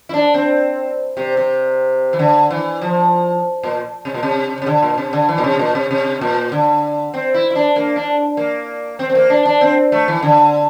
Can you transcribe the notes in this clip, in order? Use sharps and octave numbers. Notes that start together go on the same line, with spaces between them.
E4
D4
C4
C3
C3
E3
D3
E3
F3
A#2
C3
A#2
C3
C3
D3
A#2
C3
D3
E3
A#2
C3
A#2
C3
C3
A#2
D3
C4
E4
E4
D4
A#3
D4
A#3
C4
C4
A#3
D4
D4
C4
A3
E3
D3